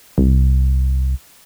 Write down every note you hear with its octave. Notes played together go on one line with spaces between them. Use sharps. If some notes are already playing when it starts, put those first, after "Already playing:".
C2